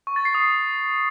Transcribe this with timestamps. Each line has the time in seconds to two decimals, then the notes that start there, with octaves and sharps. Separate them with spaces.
0.07 C#6
0.16 A6
0.25 C7
0.35 D#6